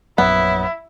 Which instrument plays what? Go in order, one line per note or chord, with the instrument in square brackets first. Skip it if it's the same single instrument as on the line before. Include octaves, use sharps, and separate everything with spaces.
[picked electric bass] A#1 F#2 F#3 [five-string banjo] B3 [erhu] E4